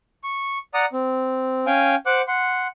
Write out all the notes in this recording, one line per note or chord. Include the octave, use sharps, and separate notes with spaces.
C#6
D5 F#5 A#5 D#6
C4
C#4 F5 G5 G#5
C5 F#5 D6 F#6
F#5 C6